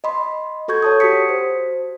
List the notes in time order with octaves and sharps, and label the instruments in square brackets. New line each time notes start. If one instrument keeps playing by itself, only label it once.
[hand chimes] D#5 B5 C6
F#4 A4 C#6 G6 G#6
C#5 A5 D#6
F#4 G4 D#6 B6 C#7
C5